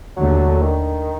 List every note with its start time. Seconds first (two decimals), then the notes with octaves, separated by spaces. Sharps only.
0.17 D#2 D3 F#3 A3
0.61 D#3